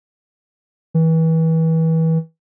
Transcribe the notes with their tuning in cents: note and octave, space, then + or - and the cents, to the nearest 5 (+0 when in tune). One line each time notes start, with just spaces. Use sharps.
E3 -30